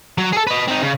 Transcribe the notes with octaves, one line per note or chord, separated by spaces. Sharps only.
F#3
G#4 A4
B4 D#5
C4 D#4
C#3